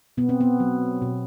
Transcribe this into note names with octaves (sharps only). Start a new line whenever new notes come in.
B2 B3
C4
B3
F#3
B2